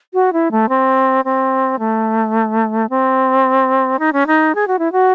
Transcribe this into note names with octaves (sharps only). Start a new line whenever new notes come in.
F#4
E4
A3
C4
C4
A3
C4
D#4
C#4
D#4
G#4
F#4
E4
F#4